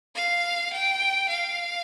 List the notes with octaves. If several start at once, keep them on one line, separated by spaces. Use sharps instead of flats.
F5
G5
F5